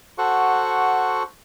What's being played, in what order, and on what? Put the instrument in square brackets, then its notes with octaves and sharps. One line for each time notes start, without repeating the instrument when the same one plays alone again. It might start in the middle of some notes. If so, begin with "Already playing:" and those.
[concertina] F#4 A4 C5 F#5 C#6